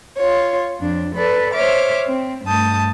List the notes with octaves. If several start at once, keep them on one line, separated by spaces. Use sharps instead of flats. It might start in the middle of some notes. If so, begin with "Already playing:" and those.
F4 C#5
F2 D4
A4 B4 D5
C5 C#5 E5 D6 F6
C4
G2 A3 A5 D#6 G6